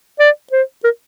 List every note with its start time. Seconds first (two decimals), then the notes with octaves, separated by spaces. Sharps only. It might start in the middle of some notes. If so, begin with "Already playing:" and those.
0.20 D5
0.52 C5
0.84 A#4